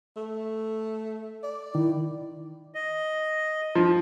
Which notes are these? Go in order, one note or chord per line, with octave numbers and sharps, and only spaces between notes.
A3
D5
D#3 E4
D#5
F3